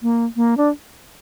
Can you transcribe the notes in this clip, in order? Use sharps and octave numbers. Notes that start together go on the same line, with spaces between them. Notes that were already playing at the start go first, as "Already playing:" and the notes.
A#3
A#3
D4